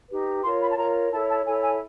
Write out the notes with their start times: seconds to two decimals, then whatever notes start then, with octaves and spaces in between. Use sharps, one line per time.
0.09 D#4 G4 B4
0.44 F4 A#4 C#5 C6
0.61 B5
0.71 A5
0.77 F4 A#4 C#5 A#5
1.11 E4 A4 C#5 A5
1.29 A5
1.45 E4 A4 C#5 G#5
1.63 G#5